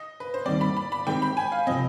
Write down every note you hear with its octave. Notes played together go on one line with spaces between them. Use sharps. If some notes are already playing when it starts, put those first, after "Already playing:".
Already playing: D#5
B4
C5
D#2 D#3 G3 C4 D5
B5
B5
B5
D#3 G#3 C4 G4 G5
B5
G#5
F5
C3 F3 C4 D#5